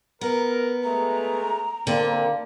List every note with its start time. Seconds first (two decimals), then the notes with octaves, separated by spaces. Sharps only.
0.21 B3 A#4
0.83 G#3 A3 A#5
1.87 D3 A#3 C4 G5